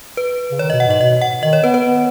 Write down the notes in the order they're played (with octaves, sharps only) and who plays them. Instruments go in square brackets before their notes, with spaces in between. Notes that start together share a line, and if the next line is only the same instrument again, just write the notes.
[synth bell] B4
[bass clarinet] C#3
[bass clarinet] D#3 [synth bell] C#5
[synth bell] D#5
[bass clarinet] B2
[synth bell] F#5
[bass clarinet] G#2 [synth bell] D#5
[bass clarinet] B2 [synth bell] D#5
[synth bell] F#5
[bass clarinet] D#3 [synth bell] D#5
[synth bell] C#5
[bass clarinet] B3 [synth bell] B4
[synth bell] B4
[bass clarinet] B3